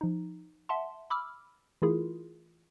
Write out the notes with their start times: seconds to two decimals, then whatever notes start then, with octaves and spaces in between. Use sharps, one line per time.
0.01 F3 D#4
0.69 E5 F#5 A5 C6
1.10 B5 D6 E6 F6
1.82 E3 A3 E4 F4 G#4 A#4